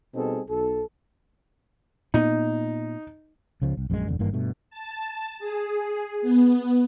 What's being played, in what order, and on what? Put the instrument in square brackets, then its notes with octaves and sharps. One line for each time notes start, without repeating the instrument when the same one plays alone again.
[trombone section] B2 G3 C4 D#4 G#4 A4
B1 A4
[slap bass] A#2 B3 [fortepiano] D#4
[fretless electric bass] C#2 C#3 F3
C2
A#1 F#2 C#3 G#3
F1 E2 D3
G#1 G2 E3 A#3
G2 B2 A3
[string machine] A5
G#4
B3